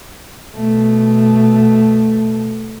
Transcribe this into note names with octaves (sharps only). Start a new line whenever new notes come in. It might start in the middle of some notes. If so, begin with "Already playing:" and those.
B2 A3